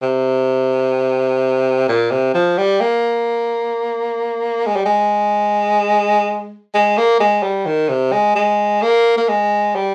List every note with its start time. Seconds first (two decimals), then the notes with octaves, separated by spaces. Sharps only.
0.03 C3
1.88 A#2
2.11 C3
2.34 F3
2.58 G3
2.81 A#3
4.66 G#3
4.76 G3
4.86 G#3
6.74 G#3
6.98 A#3
7.20 G#3
7.43 G3
7.66 D#3
7.89 C3
8.12 G#3
8.36 G#3
8.82 A#3
9.18 A#3
9.28 G#3
9.75 G3